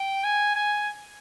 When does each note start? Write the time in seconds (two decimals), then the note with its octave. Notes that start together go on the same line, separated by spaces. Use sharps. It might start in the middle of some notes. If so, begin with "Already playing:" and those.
Already playing: G5
0.24 G#5
0.55 G#5